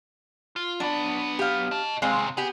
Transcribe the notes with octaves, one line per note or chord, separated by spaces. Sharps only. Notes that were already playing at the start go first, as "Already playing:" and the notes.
F4
F#3 B3 D4
G4 F5
D#5 A5
D#2 C3 G#3 C4 F5
B3 G4 G#4